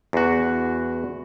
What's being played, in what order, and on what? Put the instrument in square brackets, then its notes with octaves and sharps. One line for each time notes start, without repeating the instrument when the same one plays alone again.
[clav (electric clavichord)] E2 F#4